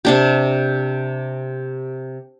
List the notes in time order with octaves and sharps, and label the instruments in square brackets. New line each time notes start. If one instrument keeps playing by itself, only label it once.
[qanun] C3 D4 G4